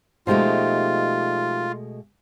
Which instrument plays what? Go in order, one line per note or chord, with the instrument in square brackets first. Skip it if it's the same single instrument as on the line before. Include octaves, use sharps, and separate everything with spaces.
[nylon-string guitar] B2 G#3 A3 [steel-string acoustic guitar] F3 D#4 G4 [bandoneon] F4